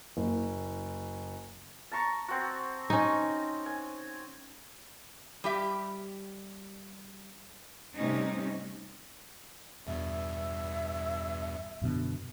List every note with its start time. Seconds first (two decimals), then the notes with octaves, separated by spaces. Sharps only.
0.17 F#1
1.91 A5 A#5 C#6
2.28 C4 F#4
2.90 C#4 D#4
3.66 G#5
5.44 G3 G4 E5
7.95 C3 G3 A3 C#4 D#4
9.87 E2 G2 B2 E5
11.82 F#2 B2 D3